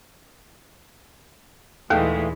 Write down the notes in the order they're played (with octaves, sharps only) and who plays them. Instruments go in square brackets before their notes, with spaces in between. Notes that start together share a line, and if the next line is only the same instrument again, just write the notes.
[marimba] D#2 [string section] A#2 E3 G#3 [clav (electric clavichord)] A3 F5 G5